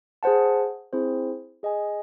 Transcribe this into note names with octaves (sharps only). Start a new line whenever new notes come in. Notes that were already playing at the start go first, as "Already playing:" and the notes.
G#4 C5 F#5 A5
C4 E4 G#4 C5
G#4 D#5 G#5